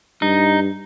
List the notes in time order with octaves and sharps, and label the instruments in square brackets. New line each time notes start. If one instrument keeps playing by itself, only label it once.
[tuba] G2 [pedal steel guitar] D#4